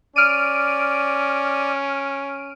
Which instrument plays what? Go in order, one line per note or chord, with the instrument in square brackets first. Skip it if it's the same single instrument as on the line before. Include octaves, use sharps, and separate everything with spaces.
[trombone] C#4 [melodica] D5 [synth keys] F6 D7 D#7